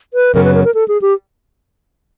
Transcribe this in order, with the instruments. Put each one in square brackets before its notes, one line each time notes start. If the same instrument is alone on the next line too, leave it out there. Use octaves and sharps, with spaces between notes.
[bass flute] B4
[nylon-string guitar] F#2 C#3 F#3 B3 [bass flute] A#4
[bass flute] B4
A#4
A#4
A4
G#4
G4